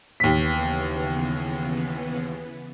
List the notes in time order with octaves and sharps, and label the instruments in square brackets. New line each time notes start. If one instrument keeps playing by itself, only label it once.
[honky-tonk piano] D#2 B6 [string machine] C#3 E3 B3